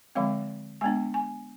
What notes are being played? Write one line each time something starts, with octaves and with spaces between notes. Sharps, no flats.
D3 F3 G#3 C4 F5
G#3 B3 D4 G#5
G#5